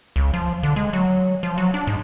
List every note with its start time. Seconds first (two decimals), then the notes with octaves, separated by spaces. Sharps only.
0.16 C#2
0.34 F3
0.63 D3
0.76 G#3
0.93 F#3
1.43 F3
1.58 F#3
1.74 D4
1.87 G#2